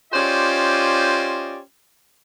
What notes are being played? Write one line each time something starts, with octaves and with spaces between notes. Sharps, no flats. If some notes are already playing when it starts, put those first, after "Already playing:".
C#4 F4 G4 C5 D5 D#5